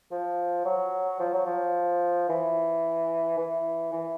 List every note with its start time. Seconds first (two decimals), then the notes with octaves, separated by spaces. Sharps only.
0.11 F3
0.65 F#3
1.20 F3
1.33 F#3
1.46 F3
2.29 E3
3.37 E3
3.93 E3